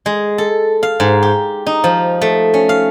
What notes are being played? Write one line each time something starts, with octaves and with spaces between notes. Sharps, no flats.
G#3
A4
F5
G#2
G4
D#4
F3
A3
C#4
F5